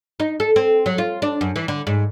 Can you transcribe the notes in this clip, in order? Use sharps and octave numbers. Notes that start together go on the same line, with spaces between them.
D#4
A4
C4
F#3
F4
D4
F#2
E3
D3
G#2